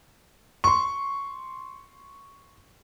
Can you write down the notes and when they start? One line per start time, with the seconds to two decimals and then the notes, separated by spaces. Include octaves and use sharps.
0.64 C6 C#6